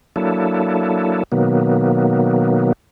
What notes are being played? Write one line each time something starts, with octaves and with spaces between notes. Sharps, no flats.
F#3 A#3 D4 E4 A4
B2 D#3 F#3 A#3 B3